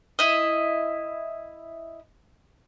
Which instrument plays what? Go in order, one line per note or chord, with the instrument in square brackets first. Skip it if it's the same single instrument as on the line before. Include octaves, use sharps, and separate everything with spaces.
[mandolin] E4 D#5